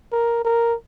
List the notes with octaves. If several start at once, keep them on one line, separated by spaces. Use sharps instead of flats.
A#4
A#4